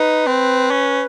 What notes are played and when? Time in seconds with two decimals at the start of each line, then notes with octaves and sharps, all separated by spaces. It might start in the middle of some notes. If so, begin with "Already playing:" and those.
Already playing: D#4 B4
0.27 C4
0.71 C#4